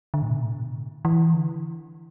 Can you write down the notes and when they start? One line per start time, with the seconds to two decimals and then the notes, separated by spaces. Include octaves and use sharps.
0.14 D3
0.22 A2
0.30 B2
0.45 A2
0.60 B2
0.74 D3
1.05 E3
1.34 D3